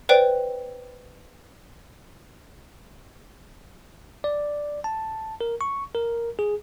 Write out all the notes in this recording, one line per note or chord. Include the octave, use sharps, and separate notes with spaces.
B4 C5 D5 G5
D5
A5
A#4
C#6
A#4
G#4